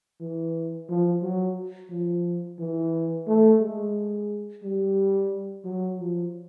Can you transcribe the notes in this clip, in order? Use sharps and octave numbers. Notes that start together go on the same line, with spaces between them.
E3
F3
F#3
F3
E3
A3
G#3
G3
F#3
F3